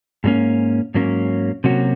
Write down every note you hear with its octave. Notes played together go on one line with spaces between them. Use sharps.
G#2 F#3 A#3 C#4
G#2 F#3 A#3 C#4
C3 F#3 A#3 C#4 F#4